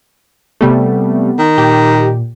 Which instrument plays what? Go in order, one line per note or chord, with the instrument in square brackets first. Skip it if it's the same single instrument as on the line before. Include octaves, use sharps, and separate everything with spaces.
[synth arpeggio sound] C3 G3 A3 [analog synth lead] B3
[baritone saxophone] D#3
[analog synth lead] A#2 [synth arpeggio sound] G4